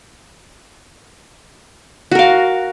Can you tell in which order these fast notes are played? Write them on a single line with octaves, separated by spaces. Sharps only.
F#4 A#4 F5